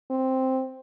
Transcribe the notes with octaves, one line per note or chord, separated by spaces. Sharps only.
C4